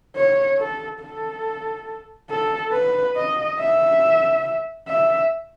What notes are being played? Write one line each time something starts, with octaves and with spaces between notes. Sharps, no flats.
C#5
A4
A4
A4
B4
D#5
E5
E5